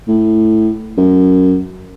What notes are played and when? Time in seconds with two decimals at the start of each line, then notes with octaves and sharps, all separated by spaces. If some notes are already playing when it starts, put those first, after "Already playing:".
0.08 A2
0.97 F#2